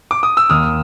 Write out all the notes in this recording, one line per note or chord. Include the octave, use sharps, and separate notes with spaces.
D6
D#6
E6
D#2 D#3 D#6 F6